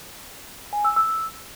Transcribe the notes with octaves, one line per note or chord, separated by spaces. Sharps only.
G#5
E6
E6